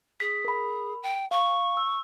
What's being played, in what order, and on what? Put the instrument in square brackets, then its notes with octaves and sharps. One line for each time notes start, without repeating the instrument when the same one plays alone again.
[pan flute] G#4 [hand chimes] B6
[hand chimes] A#4 B5
[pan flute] G5
[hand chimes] F5 [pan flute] C#6
[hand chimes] E6